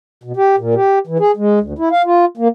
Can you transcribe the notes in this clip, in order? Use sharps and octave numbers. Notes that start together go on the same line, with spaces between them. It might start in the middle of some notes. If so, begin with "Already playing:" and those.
B2
G4
A#2
G4
E3
G#4
G#3
D2
E4
F5
F4
A#3